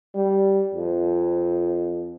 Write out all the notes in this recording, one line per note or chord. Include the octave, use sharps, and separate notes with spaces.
G3
F2